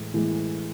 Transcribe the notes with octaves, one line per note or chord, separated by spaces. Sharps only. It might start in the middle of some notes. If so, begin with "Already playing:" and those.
Already playing: A2 E3 G#3
A2 E3 G#3